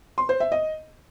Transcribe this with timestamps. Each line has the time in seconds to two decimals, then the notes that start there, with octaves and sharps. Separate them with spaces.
0.18 C6
0.29 C5
0.40 E5
0.52 D#5